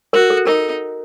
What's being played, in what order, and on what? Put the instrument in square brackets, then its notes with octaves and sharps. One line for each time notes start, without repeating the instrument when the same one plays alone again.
[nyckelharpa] F#4 [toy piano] A#4
[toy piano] A4
[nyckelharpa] D#4 [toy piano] A#4